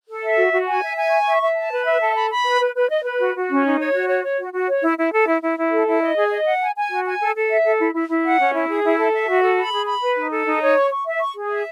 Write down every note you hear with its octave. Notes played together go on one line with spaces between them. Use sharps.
A4
E5
F#4
F#4
G#5
E5
G#5
C#6
E5
E5
A5
B4
E5
A4
B5
B5
B4
B4
B4
D#5
B4
F#4
F#4
C#4
D#4
C#5
F#4
C#5
C#5
F#4
F#4
C#5
E4
E4
A4
E4
E4
E4
A4
E4
D#5
G#4
D#5
F#5
G#5
G#5
F#4
G#5
A4
A4
E5
A4
E4
E4
E4
F#5
C#4
E4
G#4
E4
A4
E5
F#4
A4
B5
G#4
B5
B4
D#4
A4
D#4
C#5
C#6
C#6
E5
C#6
G#4
E5